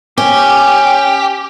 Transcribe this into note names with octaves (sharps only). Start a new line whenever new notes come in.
C#4 G4